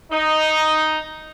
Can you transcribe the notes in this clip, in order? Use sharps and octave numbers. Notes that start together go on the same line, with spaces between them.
D#4